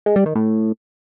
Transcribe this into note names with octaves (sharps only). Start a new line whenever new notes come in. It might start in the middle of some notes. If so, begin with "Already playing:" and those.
G#3
G3
D#3
A2